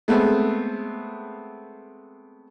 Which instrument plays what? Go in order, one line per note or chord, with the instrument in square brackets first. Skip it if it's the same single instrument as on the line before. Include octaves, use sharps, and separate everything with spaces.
[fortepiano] G#3 A3 B3 C4